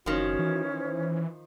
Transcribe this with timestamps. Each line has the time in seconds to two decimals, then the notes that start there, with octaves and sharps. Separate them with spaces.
0.06 F#1 D#3 F3 C#4 F#4
0.39 E3
0.78 C5